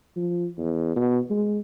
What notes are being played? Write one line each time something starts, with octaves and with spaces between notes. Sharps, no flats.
F3
E2
B2
G#3